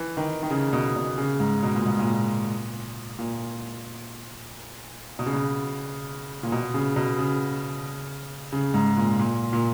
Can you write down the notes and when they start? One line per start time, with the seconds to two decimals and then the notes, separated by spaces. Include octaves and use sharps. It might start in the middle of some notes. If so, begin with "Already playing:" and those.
Already playing: E3
0.17 D#3
0.43 D#3
0.50 C#3
0.73 B2
0.96 B2
1.18 C#3
1.40 G#2
1.63 B2
1.75 A#2
1.87 G#2
1.99 A#2
3.19 A#2
5.19 B2
5.26 C#3
5.33 B2
6.43 A#2
6.52 B2
6.74 C#3
6.96 B2
7.18 C#3
8.52 C#3
8.74 G#2
8.97 A#2
9.19 A#2
9.53 A#2